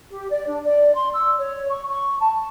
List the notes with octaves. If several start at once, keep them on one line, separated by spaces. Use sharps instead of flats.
G4
D5
D4
D5
C6
E6
C#5
C#6
C#6
A5